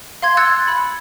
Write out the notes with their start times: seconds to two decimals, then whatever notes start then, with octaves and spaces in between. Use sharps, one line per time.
0.22 F5 C6 G#6
0.37 E6 F#6 G#6 A6 C#7
0.68 B5